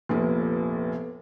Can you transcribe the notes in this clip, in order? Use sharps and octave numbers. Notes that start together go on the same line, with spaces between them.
F1 A#1 A#2 B3 A4 B4